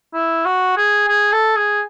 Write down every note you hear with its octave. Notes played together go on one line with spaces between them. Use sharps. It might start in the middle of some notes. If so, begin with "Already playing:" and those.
E4
F#4
G#4
G#4
A4
G#4